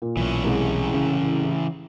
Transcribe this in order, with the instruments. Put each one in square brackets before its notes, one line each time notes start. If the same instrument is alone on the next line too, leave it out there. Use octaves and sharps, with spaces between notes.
[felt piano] A#2
[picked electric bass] B1 [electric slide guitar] E3 C#4
[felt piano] C2 G#3
[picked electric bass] C#3